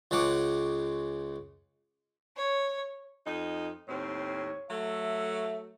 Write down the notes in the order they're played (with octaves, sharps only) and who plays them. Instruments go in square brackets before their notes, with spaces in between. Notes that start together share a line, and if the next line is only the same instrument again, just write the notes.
[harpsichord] C#2 C#3 G#3 F#5 D6
[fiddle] C#5
[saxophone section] F2 D#4
[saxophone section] D#2 A2 C4 [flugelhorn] C#5
[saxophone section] F#3 A3 [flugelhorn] E5